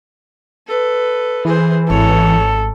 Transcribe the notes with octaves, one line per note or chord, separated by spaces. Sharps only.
A4 B4
E3 G#4 C5
G#1 A4 C#5